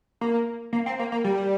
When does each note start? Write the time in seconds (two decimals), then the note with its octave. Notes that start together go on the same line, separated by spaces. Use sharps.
0.21 A#3
0.73 A#3
0.86 C4
0.99 A#3
1.12 A#3
1.24 G3